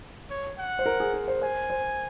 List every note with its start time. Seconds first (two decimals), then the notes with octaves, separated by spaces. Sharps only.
0.30 C#5
0.58 F#5
0.79 C5
0.86 A#4
1.00 G#4
1.14 A#4
1.28 C5
1.42 C5 G#5
1.70 C5